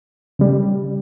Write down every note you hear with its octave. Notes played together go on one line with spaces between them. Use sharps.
C#3 G3